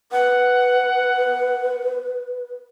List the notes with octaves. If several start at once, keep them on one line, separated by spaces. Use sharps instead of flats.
B4 F#5